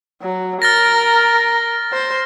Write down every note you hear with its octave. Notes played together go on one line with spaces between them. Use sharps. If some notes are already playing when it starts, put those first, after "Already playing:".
F#3
A#4 F6 A6 A#6
C5